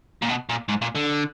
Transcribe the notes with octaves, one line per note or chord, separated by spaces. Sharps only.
A#2
B2
A#2
G#2
A#2
D3